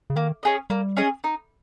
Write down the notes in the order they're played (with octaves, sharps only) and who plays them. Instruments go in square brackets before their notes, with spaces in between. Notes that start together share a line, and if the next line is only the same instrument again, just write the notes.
[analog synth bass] C#3
[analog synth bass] D#3 [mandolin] A#3
[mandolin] C#4 G#4 D#5
[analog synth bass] G3 [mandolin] A#3
[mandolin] C#4 G#4 D#5
D#4